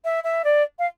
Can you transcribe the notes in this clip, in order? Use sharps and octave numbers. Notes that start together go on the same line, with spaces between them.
E5
E5
D5
F5